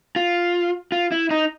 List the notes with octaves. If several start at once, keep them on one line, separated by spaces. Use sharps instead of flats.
F4
F4
E4
D#4